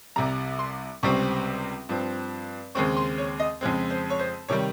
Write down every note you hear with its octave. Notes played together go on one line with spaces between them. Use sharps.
C2 C3 G3 A#5
C6
C#2 C3 G3 C4 C#6
G2 F3 C4
D#2 C#3 G#3 C4 C#6
C6
C#5
D#5
F2 C#3 G#3 C4
C5
C#5
C5
C3 D#3 G3 C#5